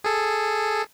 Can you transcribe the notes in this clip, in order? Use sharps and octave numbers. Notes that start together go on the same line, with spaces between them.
G#4 A4